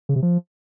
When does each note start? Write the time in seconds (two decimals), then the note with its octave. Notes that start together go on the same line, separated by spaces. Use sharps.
0.09 C#3
0.16 C3
0.23 F3